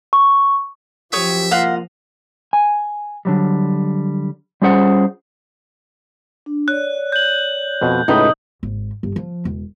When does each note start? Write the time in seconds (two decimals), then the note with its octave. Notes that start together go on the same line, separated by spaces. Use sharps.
0.13 C#6
1.13 F#2 F3 G4 C#5 E5 D#6
1.51 C2 A#3 F4 D#5 F5 F#5
2.53 G#5
3.25 D3 F#3 G3
4.62 G3 C#4 F4 G#4 C5 F#5
6.46 D4
6.68 C#5 D5 F#6
7.12 G6 F#7
7.81 F2 B2
8.08 C#2 A2 D#4 B4
8.63 G#1
9.03 G1
9.16 F3
9.45 E1